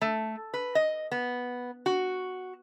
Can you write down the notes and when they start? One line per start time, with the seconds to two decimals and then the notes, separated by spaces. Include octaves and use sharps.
0.01 A3
0.54 B4
0.75 D#5
1.11 B3
1.86 F#4